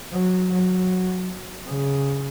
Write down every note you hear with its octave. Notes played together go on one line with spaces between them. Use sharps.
F#3
F#3
C#3